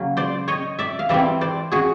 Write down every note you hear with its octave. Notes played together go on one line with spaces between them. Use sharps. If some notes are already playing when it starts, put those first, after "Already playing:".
Already playing: C#3 F#3 A#3 C#4
C5 D5
C#5 D#5
D5 E5
F5
E3 G3 C4 D5 E5
C5 D5
F#4 G#4